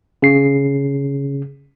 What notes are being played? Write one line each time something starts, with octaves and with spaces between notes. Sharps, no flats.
C#3 C7